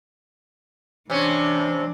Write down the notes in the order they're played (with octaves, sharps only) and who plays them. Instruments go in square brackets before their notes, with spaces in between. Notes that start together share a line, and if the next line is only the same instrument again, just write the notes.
[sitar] C3 C#4 [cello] E3 D4